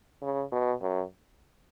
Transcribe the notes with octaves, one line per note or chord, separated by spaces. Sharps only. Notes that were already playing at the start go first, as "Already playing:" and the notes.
C#3
B2
F#2